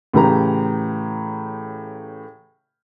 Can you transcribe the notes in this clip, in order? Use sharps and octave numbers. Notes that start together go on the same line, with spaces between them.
A2 C#3 E3 G4 A#5